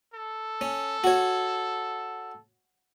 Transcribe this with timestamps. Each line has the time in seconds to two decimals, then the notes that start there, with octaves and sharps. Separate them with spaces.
0.14 A4
0.61 C#4
1.04 F#4 C#5